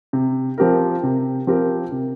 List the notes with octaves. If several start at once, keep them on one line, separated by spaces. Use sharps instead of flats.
C3
F3 C4 G4 A#4
C3
F3 C4 G4 A#4
C3